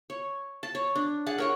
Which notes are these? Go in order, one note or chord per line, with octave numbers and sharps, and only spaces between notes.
C#5
A5
C#5
D4
G#4 F#5 A5
A#4 C#5 F#5